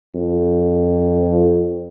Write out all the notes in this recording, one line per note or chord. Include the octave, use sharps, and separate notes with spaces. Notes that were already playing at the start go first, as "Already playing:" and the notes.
F2